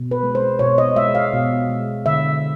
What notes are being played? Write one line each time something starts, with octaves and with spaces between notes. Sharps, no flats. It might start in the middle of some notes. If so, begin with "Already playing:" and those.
Already playing: B2
B4
G#3
C5
B2 C#5
D#5
G#3 E5
F5
B2
G#3
D3 E5